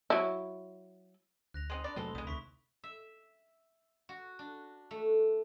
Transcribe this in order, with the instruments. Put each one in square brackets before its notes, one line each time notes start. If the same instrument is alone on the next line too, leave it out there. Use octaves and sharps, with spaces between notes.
[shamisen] F#3 E4
[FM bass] D2 [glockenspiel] F#6 A#6 F7
[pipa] G#3 C4 D#4 [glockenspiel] C6 D#6
[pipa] D4 D5 [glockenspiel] B5
[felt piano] F1 [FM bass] F#3 [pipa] G#3 C4 A4 [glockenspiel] G7
[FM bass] B1 [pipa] G3 G#3 [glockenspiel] D#6
[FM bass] D2 [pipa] E4 [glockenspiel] B5 C#6 B6
[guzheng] E5
F#4
D4
A3